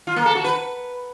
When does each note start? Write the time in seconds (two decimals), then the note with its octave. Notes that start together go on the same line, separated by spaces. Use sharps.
0.07 F4
0.16 A#3
0.26 A4
0.35 F#4
0.44 B4